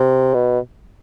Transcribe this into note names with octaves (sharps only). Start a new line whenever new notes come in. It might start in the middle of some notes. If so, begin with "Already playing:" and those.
Already playing: C3
B2